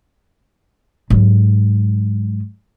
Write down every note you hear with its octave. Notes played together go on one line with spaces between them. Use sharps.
G#2 F#3